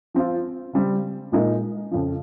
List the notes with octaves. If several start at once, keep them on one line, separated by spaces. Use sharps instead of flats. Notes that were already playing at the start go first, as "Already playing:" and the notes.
F3 C4 F4
C#3 G3 C4
A#2 G#3 D#4 A#4
F2 C#3 F3